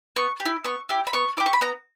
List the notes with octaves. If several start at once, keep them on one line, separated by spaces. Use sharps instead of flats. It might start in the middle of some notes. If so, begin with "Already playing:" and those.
B3 C#6
G4
E4
B3 C#6
E4 G4
B5
B3 C#6
E4 G4 D6
C#6
B5
B3 A#5